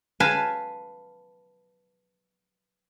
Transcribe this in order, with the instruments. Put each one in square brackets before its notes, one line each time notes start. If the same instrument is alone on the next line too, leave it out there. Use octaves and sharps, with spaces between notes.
[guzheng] B4 F5 G#5 A5